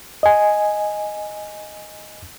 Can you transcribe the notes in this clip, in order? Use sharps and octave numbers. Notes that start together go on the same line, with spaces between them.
D#5 G#5